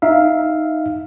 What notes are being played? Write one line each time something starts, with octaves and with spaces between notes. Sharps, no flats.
D#4 E5 F5